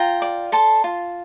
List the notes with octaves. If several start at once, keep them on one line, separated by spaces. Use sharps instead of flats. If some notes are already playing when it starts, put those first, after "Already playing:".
Already playing: F4 G5 A#5
D5
A4 A5 C6
F4